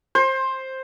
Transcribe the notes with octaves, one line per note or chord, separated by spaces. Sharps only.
C5